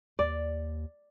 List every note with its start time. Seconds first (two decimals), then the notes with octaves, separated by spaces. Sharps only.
0.19 D#2 D5